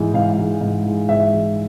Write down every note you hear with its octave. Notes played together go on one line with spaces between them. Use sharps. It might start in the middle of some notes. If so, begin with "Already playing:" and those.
Already playing: G#2 E3 G#3
G#2 F5
E3 G#3
G#2
E3 G#3
G#2 E5
E3 G#3